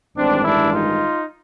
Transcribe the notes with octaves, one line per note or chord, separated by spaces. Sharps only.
A1 G2 D#3 G#3 C4 D4
D4 E4
D#4 F4